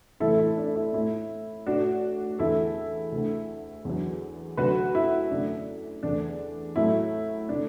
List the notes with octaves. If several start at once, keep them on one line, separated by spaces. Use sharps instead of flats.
A2 E3 A3 E4 A4
E4
D4
E4
A2 A3 E4
A2 A3 D4 F#4
E2 D3 A3 E4 A4
D2 D3 A3
E2 D3 F#3
D2 D3 F#3 A3 F#4 B4
E4
F#2 D3 A3 D4
E2 D3 A3 D4
A2 F#3 A3 E4
D3 A3 D4